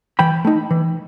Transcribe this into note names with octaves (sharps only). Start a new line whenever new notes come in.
E3 G5 B5
A3 D#4
E3